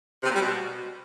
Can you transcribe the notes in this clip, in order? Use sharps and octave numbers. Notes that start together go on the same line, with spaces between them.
C3
A#2
G3
B2